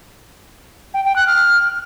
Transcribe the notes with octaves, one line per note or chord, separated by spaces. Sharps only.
G5
G5
F#6
F6